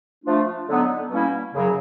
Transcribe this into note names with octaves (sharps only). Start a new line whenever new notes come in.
F3 A3 D4 F4
D3 F#3 B3 D#4
B2 G3 A#3 C#4 E4
F#2 C#3 F#3